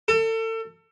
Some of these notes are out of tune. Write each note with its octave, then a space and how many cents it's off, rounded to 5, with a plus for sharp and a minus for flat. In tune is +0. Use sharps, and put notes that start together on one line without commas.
A4 +35